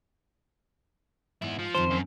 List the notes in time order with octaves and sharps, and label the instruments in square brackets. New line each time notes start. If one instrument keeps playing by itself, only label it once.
[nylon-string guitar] G#2 [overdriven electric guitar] B3 E4
[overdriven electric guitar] F3
[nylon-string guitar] F2 D#3 A5 [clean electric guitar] C5
[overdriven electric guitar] F#2